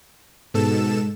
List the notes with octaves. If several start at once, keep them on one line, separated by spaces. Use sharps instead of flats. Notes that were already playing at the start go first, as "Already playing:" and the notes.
G#2 B2 A4 E7